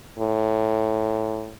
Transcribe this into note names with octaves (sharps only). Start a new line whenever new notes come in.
A2